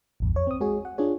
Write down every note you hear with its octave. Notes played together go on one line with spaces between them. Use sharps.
A1 E2 G2
F2 C#5
C4 D#6
G#3 F#4 G#4 C#5
F#5
D4 F4 G#4 C#5